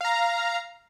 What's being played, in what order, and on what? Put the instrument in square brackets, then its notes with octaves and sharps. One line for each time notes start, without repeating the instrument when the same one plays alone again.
[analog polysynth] F5 A#5